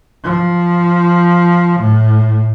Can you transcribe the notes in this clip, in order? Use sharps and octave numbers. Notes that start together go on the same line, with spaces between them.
F3
A2